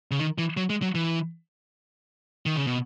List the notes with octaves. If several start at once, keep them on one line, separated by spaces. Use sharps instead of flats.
C#3
D#3
E3
F#3
G#3
F#3
E3
D#3
C#3
B2